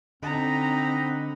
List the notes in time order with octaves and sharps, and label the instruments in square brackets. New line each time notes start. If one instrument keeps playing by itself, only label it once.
[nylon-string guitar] D3 [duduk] C4 [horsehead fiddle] D#4 A#5 [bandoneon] D#5 F#5 B5